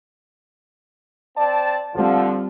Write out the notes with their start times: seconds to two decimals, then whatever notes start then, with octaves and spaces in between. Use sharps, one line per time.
1.37 C4 D5 A5
1.95 D3 F3 G3 C4 F4